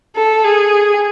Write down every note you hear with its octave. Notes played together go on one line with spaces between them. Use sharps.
A4
G#4